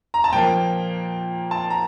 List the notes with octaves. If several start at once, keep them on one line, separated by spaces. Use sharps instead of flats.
A#5
A5
A#2 F3 A#3 G5
A5
A#5